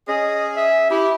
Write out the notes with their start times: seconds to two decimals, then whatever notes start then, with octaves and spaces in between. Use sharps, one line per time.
0.08 C#4 G#4 D#5
0.57 E5
0.90 E4 G4